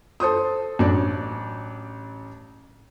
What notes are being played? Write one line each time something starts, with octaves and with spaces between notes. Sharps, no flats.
A4 C5 C6 D#6
A1 F#3 D4 D5